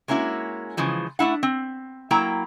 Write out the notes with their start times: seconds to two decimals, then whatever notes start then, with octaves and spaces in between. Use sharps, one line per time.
0.08 G#3 A#3 C#4 E4 F#4
0.77 C#3 E3 F3 G#3
1.19 A3 D4 E4 F#5
1.43 C4
2.11 F#3 A#3 E4 G5 A#5